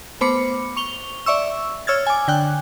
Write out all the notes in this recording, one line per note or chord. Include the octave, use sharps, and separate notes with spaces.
A3 B3 C5 B5 D6 C#7
C#6 F7 G7
D5 E5 C#6 E6
C#5 E6 F6 G#6 A6
G#5 D6
D3 G5 F#6